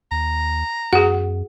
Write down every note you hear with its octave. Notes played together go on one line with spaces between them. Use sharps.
D#2 A#5
F#2 F#4 G#4 F#5